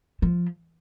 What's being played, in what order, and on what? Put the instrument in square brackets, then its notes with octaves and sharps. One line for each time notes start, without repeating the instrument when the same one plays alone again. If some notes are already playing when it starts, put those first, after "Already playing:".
[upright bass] F3